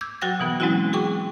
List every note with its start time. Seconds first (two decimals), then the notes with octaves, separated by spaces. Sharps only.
0.01 D6 E6 G6 G#6
0.21 F#3 F#4 F#5 G5 A6 A#6
0.40 B2 E3 B3
0.60 F#3 G#3 C4 C#4 E4 F#4
0.93 F#4 G#4 G5 C#6 D6